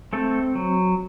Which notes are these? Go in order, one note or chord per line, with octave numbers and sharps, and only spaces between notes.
A3 C4 A4
F#3